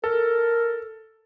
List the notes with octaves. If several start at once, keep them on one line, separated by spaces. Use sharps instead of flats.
A4 A#4